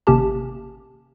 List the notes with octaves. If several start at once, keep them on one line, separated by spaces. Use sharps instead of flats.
G#1 C3 A#3 C#4 G4 A5